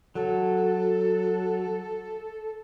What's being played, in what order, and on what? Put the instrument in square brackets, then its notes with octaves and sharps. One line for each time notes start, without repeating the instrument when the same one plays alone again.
[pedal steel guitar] F#3 [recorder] A4